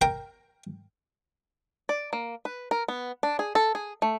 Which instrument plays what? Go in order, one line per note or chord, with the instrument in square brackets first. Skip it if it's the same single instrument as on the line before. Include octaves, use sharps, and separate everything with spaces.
[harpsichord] A#4 G5 A#5
[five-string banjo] D5
A#3
B4
A#4
B3
D4
G#4
A4
G#4
A3